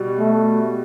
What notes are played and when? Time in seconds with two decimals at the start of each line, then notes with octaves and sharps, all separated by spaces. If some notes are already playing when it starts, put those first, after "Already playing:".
Already playing: B2 G3
0.19 A3